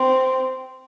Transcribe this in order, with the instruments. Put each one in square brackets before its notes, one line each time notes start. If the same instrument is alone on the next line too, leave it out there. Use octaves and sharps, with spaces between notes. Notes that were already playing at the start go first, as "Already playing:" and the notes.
Already playing: [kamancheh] C4